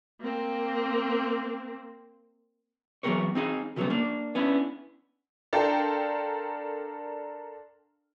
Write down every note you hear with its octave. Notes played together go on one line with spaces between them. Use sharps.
A#3 C4
E3 F#3 B3 G#4 A#4 C#5
C4 D#4 G#4 F5
C#3 F3 F#3 G#3 A3 B3
A#3 D4
B3 C#4 D4 E4
D4 A4 A#4 F5 G5 C6